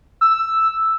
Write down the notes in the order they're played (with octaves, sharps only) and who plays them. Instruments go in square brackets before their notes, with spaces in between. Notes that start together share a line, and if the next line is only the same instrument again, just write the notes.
[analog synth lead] E6